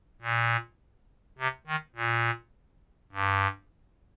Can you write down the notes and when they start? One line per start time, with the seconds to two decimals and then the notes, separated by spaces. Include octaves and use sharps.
0.22 A#2
1.39 C3
1.67 D#3
1.96 A#2
3.12 G2